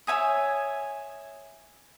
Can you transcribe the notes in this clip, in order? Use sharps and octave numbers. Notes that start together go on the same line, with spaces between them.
C#5 E5 G#5 D#6